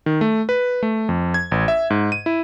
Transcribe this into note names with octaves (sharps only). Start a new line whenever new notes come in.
D#3
A3
B4
A3
F2
G#6
A1
E5
G#2
D#7
E4